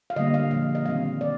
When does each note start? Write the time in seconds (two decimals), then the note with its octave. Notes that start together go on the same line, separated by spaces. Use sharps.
0.10 F5
0.16 D3 G3 A#3 D#5
0.34 F5
0.51 A#2 F3 G#3 F5
0.75 D#5
0.86 D#3 G3 C4 F5
1.21 C3 D5